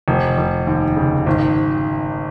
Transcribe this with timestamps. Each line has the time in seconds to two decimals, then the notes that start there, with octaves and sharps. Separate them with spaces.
0.08 F1
0.38 F1
0.67 D#2
0.96 C#3
1.26 G#1